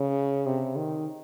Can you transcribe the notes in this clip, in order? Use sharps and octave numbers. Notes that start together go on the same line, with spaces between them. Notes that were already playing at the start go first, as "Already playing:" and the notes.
Already playing: C#3
C3
D#3